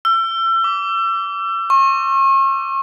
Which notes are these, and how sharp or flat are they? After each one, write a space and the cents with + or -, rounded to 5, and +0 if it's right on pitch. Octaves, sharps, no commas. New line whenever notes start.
E6 +35
D6 -30
C#6 -40